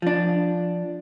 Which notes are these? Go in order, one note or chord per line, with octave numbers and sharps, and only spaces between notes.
F3 D4